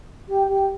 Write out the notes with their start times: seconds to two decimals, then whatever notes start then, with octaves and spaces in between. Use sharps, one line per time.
0.28 G4
0.49 G4